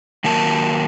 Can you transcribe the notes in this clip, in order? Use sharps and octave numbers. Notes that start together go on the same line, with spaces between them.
D#3 F#3 A#3 A#4 A5